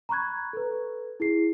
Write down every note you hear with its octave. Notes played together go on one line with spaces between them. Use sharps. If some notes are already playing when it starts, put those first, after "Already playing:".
A#5 B5 C#6 F#6 G#6
A4 B4
E4 G#4 C7